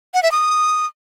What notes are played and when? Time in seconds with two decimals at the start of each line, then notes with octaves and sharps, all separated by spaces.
0.14 F#5
0.23 E5
0.32 D#6